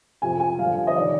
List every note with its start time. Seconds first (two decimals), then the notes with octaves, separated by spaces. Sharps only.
0.22 F2 C3 F3 C4 G#5
0.40 G#5
0.58 F2 D3 G3 F5
0.87 D#5
0.96 C3 D#3 D5